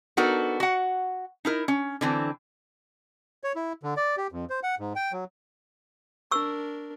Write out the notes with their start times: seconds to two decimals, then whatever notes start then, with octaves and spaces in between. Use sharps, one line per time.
0.17 B3 D4 D#4 F#4 A4 A#4
0.60 F#4 F#5
1.45 D#4 E4 A#4
1.68 C#4
2.01 D3 E3 C4
3.44 C#5
3.56 E4
3.83 D3
3.97 D5
4.17 G4
4.32 F2
4.50 C5
4.63 F#5
4.79 G#2
4.96 G5
5.12 F#3
6.31 D4 A#4 C#6 E6